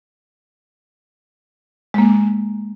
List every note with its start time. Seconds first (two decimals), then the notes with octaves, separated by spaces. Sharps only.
1.94 G#3 A#3